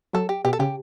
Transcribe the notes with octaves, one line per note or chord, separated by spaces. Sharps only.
F#3 A4
G4
B2 G4
A4
C#3 G4